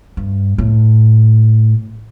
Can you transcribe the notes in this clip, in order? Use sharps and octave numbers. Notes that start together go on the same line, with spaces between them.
G2
A2